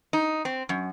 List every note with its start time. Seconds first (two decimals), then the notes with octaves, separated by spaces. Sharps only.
0.13 D#4
0.45 C4
0.69 F#2